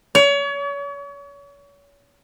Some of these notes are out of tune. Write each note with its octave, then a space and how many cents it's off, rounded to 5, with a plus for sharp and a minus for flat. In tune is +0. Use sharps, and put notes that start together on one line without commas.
C#5 +35